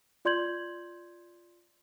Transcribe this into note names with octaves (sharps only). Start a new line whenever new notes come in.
F4 D5 C6 G6 G#6 F#7